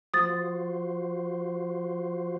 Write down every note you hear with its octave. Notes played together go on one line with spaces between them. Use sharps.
F3 F#4 C5 D#6 A6